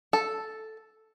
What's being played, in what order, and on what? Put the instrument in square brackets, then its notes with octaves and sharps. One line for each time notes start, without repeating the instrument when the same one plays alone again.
[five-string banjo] A4